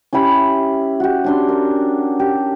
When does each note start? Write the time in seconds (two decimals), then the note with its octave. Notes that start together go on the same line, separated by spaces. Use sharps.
0.13 C#4 E4 G4 B5
1.00 F#4 G4
1.24 C#4 D4 C6
1.49 A#4
2.20 G4